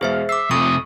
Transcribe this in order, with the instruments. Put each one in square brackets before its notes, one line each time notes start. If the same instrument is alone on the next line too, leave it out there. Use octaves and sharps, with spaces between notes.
[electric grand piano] E2 B2 G#3 [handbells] G#4 C5 E5 [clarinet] F5
[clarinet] E5 [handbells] D6 E6 [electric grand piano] C7
[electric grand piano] F2 [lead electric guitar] C3 A3 [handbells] C#6 [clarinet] D#6